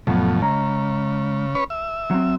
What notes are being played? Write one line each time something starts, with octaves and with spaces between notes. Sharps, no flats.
F2 A2 C3 F#3 B3
C#3 G#3 A#5
C#4 B4 C#5
E5
F#3 C4